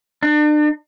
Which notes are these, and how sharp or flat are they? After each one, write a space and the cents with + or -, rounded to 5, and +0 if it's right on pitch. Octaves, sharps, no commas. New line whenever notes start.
D4 +35